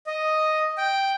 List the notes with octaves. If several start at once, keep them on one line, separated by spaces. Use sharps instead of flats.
D#5
G5